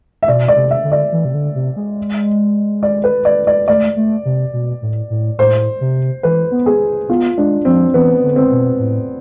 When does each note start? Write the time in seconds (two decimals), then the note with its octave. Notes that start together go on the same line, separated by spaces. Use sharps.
0.23 E5
0.28 B2 D5
0.48 D5
0.56 C3
0.71 E5
0.84 D3
0.92 D5
1.12 E3
1.25 C3
1.34 D3
1.55 C3
1.76 G#3
2.83 D5
3.04 B4
3.25 D5
3.47 D5
3.68 A3 D5
3.96 A3
4.25 C3
4.53 B2
4.82 A2
5.10 A2
5.38 A2 C5
5.81 C3
6.23 E3 B4
6.51 B3
6.66 G#4
7.09 B3 F4
7.38 G#3 D4
7.65 F3 C4
7.94 E3 B3
8.23 D3
8.36 C4
8.51 B2
8.79 A2